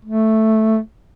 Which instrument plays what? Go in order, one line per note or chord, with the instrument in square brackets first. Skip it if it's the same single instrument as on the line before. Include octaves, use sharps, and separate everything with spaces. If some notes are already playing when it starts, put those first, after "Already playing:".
[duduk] A3